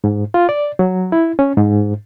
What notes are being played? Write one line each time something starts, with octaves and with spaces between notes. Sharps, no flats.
G#2
F4
D5
F#3
E4
C#4
G#2